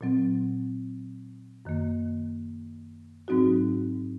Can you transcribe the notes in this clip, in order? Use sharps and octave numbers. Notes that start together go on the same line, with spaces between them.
A#2 F#3 C4
F#2 D#3 A#3
G#2 F#3 C4 D#4 F#4